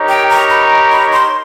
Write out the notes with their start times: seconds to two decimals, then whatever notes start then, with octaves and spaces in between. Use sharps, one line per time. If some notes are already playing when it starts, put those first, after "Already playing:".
Already playing: D#4 G4 A#4 C#5
0.09 G5
0.30 A#5
0.50 B5
0.92 B5
1.12 C6